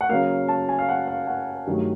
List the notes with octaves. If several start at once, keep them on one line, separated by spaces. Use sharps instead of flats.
F#5
C#3 F#3 A#3 F5
A5
G#5
F5
F#5
F5
F#5
G2 D#3 F#3 A3